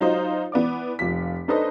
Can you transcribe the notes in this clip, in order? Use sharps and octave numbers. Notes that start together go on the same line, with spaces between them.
F#3 D#4 F4 C5 D#5
E3 B3 D5 D6
F1 F4 B6
D4 D#4 A4 B4 C5 D#5